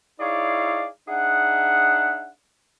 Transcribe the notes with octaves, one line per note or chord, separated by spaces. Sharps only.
D#4 E4 G#4 C#5 D5 F5
D4 D#4 G#4 E5 F#5